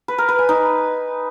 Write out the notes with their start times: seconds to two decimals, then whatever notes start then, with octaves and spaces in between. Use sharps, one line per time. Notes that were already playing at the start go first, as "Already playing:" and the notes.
0.08 B4
0.18 A#4
0.29 B4
0.39 G#5
0.49 D#4